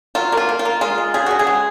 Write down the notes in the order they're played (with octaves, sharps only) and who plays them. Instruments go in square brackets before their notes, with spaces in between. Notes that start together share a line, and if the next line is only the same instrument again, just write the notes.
[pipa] F#3 F4
A#3
F4
A#3
F4
A#3
G#3 F4
G#3
C#3 G#4
C#3 F#4
G#4
G#3